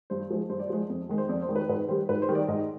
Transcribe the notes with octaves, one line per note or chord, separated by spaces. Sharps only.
G2 C5
F3 G#3
G2 C5
D5
F3 G#3 C5
F2
D#3 G#3
C5
F2 D5
C5
D#3 G#3
B4
G#2 B4
D#3 G3 C5
G#2 B4
C5
D#3 G3
D5
G#2 D#5